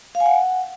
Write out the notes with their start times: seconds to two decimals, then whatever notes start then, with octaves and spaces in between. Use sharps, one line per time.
0.15 F5
0.20 G#5
0.26 F#5